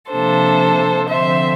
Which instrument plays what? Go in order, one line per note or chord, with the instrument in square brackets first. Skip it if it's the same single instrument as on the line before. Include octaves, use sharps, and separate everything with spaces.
[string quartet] C3 F3 A#3 D4 A4 C5
D3 F3 C4 C5 E5